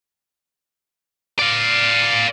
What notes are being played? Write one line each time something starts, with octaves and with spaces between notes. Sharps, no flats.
D5 F5